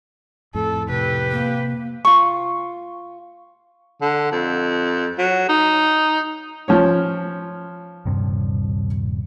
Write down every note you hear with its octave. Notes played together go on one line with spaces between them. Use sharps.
F2 A2 A4
C3 G4 B4
A#3
F4 C#6
D3
F2
F#3
D#4
F3 C#4 C#5
D#1 G2 C3